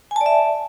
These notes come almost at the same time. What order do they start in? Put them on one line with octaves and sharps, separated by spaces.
G#5 A5 D5 E5